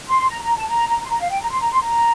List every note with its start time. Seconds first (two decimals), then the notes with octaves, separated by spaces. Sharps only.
0.08 C6
0.29 A#5
0.43 A#5
0.56 A5
0.69 A#5
0.89 A#5
1.05 C6
1.11 A#5
1.20 F5
1.31 G5
1.41 A#5
1.50 C6
1.61 A#5
1.71 C6
1.81 A#5